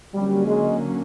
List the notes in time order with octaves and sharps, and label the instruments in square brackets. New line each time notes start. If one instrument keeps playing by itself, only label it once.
[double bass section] D3 F#3 A#3 C#4 [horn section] G3
[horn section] G#3